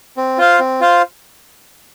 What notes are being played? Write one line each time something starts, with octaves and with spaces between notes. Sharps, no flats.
C4
F4 C5 F5
C4
F4 C5 F5